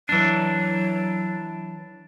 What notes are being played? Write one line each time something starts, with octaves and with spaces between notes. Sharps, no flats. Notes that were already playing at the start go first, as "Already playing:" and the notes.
E3 F#3 D4